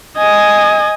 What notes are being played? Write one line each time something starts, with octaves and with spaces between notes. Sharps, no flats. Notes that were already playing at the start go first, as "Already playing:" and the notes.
D#5 G#5